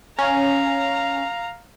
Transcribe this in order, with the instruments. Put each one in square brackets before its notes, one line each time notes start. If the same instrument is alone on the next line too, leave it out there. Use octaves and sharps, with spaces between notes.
[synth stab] C#4 [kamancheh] F5 A#5